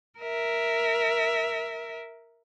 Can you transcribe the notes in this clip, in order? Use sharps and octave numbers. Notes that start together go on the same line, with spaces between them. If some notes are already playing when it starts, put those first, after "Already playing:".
A#4 E5